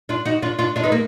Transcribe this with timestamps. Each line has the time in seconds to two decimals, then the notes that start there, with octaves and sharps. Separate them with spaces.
0.09 D4 F4
0.25 D#4 F#4
0.42 D4 F4
0.59 D4 F4
0.76 D4 F4
0.83 B3 D#4
0.92 A#3